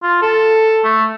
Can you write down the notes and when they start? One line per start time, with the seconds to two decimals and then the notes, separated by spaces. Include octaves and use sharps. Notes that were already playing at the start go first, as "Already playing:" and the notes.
0.03 F4
0.22 A4
0.84 A3